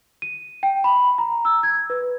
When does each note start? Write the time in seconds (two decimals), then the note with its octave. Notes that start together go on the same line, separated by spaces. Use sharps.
0.22 D#7
0.63 G5
0.84 B5
1.18 A#5
1.45 E6
1.63 G#6
1.90 B4